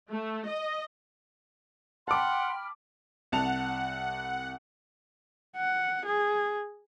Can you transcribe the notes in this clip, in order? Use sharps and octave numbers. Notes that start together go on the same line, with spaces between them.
A3
D#5
F#5 G5 A5 B5 C6 D6 F6
C2 F#5 A5 F7
F#5
G#4